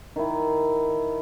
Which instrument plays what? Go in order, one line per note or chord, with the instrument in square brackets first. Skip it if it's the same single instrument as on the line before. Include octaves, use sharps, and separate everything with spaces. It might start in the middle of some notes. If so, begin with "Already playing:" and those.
[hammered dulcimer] D#3 E4